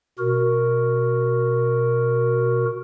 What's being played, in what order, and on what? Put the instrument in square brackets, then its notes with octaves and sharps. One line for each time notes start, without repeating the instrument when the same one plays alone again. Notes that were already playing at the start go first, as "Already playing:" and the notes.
[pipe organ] B2 F#4 A#4